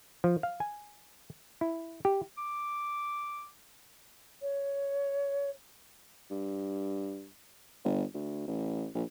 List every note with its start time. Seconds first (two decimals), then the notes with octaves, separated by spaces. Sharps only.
0.24 F3
0.43 F5
0.60 G#5
1.61 E4
2.05 G4
2.38 D6
4.41 C#5
6.31 G2
7.85 G1
8.14 D2
8.47 A1
8.95 A#1